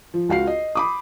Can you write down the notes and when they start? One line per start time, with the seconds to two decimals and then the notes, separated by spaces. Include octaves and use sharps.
0.14 F3
0.29 C#2 F#4 F5 C7
0.47 D#5
0.75 B5 D6 D#6